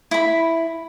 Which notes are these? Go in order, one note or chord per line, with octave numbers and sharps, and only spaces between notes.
E4 B5